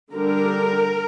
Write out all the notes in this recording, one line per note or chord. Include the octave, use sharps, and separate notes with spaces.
D3 G3 D4 A#4